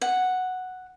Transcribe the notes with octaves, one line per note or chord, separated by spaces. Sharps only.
F#5